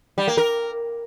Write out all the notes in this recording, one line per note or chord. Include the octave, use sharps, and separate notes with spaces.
G3
A#3
A#4